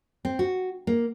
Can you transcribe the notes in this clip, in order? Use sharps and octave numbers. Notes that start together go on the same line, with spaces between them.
C4
F#4
A#3